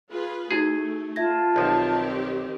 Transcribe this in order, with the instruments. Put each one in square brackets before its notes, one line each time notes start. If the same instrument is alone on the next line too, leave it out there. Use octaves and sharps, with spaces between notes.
[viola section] F4 G#4 B4
[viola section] A3 [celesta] D#4 E4 F#4 [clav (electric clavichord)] G#4
[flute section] F4 A5 [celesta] E5 G#6 A#6
[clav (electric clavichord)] B1 F3 [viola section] D#3 C4 G4